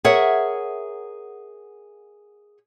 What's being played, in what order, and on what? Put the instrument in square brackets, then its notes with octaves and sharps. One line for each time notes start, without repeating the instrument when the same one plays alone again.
[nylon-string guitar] G#4 A#4 C#5 E5 F#5